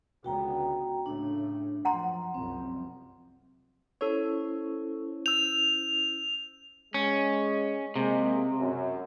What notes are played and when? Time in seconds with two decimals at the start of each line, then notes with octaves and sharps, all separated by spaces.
0.24 C#2 D3 B3 F#4 G5 A#5
1.06 A2 C#3 A3 D4
1.85 F#2 F3 F#5 A#5 C6
2.34 F#1 C2 F3 C4
4.01 C#4 E4 A4 C5 C#5
5.26 E6 G6 F7
6.94 G#3 C#4
7.96 C3 G#3 A#3
8.60 F#2